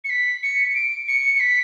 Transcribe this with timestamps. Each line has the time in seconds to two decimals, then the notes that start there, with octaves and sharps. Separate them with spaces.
0.04 C#7
0.10 B6
0.43 C#7
0.75 D7
1.08 C#7
1.35 C#7
1.40 B6